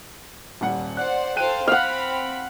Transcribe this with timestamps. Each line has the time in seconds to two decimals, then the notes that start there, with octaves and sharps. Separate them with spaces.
0.61 D#1 G3 F#5
0.97 C5 D5 F#5 F#6
1.36 A4 C5 F5 G5 F#6 D#7
1.68 C4 F5 F#5 B5